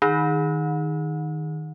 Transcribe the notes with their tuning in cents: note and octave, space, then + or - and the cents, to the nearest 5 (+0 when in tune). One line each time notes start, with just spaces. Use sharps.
D#3 +0 D#4 +0